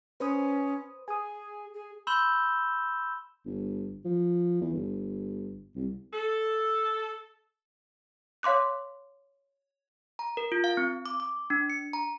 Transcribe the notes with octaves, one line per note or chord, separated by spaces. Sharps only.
C#4 B4 C5 D#6
G#4 G#5 D#6
G#4
B5 C6 E6 G6 E7 G7
G1
F3
E2
G1
C2
A4
C#5 F5 C6 D6 F#6
A#5
A#4
F4
F5
C4
D6
D6
D4
C#7
A#5